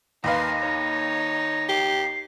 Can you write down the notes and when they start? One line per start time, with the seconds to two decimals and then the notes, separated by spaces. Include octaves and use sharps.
0.24 D#2 D#4 B4 F5 C6 A#6
0.59 D#4 C#5
1.69 G4 C7